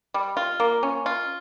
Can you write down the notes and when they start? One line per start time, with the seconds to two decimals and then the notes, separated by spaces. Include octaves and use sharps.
0.14 G3
0.37 F4
0.60 A#3
0.83 C#4
1.06 F4